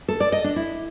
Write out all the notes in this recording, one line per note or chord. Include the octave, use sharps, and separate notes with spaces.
A4
D5
D#5
D4
E4